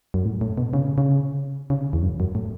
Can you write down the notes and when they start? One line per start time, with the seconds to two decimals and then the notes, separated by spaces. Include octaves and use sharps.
0.14 F#2
0.25 A2
0.41 A2
0.58 B2
0.73 C#3
0.98 C#3
1.70 C#3
1.93 E2
2.03 F#2
2.20 F#2
2.35 A2